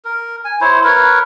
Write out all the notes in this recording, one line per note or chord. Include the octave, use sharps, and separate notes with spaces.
A#4
G#5
E4 C5 C#5
A#4 B4 C#5